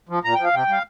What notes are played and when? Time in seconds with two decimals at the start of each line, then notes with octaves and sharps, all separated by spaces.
0.09 F3
0.24 A#2 A#5
0.34 F3 G5
0.45 F5
0.53 C3 G5
0.68 G3 F5